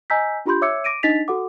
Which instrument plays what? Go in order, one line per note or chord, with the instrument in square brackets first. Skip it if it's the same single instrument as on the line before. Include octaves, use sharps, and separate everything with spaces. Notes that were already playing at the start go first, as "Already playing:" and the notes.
[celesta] D#5 G#5 A#5 E6 G6 B6
D4 F4 G4 B5 C6 G6
C#5 E5 D6 E6 G#6 C#7
D6 A#6 D7 D#7
D4 D#4 D#5 A6 B6 F7
F#4 A4 F#5 D6